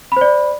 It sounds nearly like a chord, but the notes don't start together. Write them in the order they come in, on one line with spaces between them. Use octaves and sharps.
B5 C5 D5